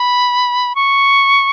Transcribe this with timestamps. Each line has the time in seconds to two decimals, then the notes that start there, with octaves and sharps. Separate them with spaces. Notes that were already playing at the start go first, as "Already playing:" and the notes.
Already playing: B5
0.75 C#6